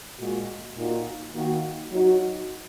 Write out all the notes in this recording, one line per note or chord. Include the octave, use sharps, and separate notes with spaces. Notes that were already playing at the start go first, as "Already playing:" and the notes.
A#2 G#3 F#4
A#2 A#3 D#4 F#4
D#3 A#3 F#4
F#3 D#4 F#4